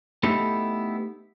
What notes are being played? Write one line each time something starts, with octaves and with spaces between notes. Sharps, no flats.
A3 B3 D#4 E4 G4 A4